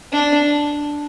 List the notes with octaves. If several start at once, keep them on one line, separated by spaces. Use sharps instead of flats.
D4